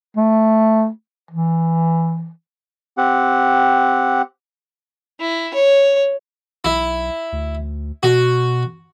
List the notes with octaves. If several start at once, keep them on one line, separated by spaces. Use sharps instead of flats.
A3
E3
C4 G4 F#5
E4
C#5
B1 E4
D2
B2 F#4